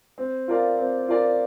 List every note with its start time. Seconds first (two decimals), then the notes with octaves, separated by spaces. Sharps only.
0.18 C4
0.48 F4 A#4 D5 F5
0.78 C4
1.09 F4 A#4 D5 F5